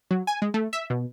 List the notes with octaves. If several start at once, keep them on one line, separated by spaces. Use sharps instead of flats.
F#3
G#5
G#3
A3
E5
B2